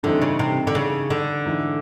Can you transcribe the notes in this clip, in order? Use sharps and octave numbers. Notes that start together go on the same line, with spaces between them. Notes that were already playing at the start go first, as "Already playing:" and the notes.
G2 D3 E3 A3 C4 D#4
C#3
C3
D3
C#3
D3
G#2 E3 A3